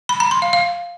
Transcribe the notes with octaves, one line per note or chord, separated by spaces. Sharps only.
B5
A#5
C6
F5
F5